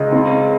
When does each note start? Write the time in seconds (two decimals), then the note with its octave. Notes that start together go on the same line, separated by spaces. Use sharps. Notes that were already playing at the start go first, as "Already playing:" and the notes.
Already playing: C#2 D#5
0.12 C4